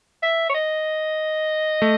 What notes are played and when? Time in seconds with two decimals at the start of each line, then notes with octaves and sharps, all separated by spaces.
0.23 E5
0.50 C#5
0.54 D#5
1.82 A3